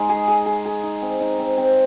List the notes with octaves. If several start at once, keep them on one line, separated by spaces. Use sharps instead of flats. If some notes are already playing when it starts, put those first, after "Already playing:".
Already playing: G#3 D#4
G#4
G#4
G#4
G#4
D#4
C4
D#4
C4
C4